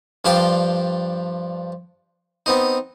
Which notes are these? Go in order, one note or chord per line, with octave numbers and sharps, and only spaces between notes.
G2 F3 D4 F5 G5 C6
B3 C4 D#4